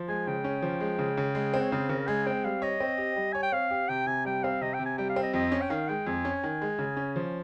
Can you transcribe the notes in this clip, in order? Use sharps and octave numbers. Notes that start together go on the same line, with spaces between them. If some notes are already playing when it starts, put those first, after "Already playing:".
Already playing: F3
G#3 G#5
C#3 G5
C#4
F3
G#3
C#3
C#3
G#3
C4
C#5
C#3 C5
C#3 A#4
G#3 G#5
C4 G5
G3 F5
C#5 D#5
C4
G4
G3
C#5 G#5
G5
C4 F5
G4
C3 G5
C3 G#5
G3 G5
C4 F5
C3 D#5
G5
C3
G#5
G3 G5
F5
C4
D#5
F2 D#5
C#4
G5
D#3 F5
G#3 G5
F2 G#5
C#4
D#3
G#3
C#3
C#4
F3